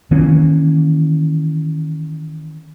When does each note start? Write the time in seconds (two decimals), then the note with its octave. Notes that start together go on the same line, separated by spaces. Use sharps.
0.11 D#3 E3 A#3 C#4